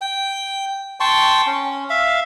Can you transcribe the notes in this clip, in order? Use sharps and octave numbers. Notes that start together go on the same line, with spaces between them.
G5
G5 A5 C6 C#6
C#4
E5 F5